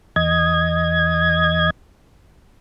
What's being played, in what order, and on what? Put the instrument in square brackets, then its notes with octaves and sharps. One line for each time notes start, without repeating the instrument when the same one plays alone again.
[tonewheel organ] E2 D#5 G#6